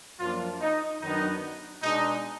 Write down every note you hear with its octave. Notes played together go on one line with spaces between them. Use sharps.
F#2 F3 A#3 D4 F4
D#4
F#2 D#3 F#3 B3 D4 D#4
B2 G#3 D4 D#4